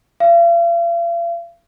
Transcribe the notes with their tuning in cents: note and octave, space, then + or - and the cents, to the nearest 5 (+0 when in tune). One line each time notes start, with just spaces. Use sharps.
F5 -45